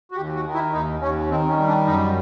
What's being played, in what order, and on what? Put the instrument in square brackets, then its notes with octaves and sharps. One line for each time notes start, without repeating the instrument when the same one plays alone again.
[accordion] F#4
D#2 G4
F#4
D#3
E4
D#2 D#4
D#2 C#4
D#3 C4
C#4
G3
D4
F#2 D#4